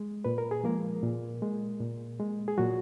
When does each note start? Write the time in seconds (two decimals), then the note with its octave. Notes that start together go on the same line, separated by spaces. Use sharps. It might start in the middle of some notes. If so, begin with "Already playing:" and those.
Already playing: G#3
0.25 A#2 B4
0.38 A#4
0.51 G#4
0.64 F3 G#3 A#3 A#4
1.03 A#2
1.42 G#3
1.80 A#2
2.19 G#3
2.48 G#4
2.58 A#2 F#3 F#4